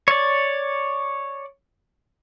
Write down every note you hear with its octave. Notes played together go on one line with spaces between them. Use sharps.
C#5 D5